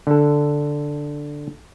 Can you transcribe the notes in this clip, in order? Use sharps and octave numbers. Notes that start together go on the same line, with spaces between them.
D3 A4